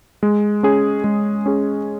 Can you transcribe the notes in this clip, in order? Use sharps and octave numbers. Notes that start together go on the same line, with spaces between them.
G#3
C#4 G#4
G#3
C#4 G#4